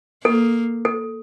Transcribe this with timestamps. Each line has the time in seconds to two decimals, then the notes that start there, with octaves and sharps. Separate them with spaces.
0.24 A#3 A4
0.85 A4